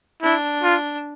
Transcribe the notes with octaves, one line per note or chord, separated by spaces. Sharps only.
D4 E4
F4